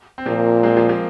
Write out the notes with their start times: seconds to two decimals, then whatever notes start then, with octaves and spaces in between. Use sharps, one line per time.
0.18 C4
0.26 A#2 F3 A#3
0.63 G#3 C4
0.76 F3 A#3
0.89 F3 A#3